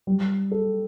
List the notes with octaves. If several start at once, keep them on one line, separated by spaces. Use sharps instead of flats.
G3
A4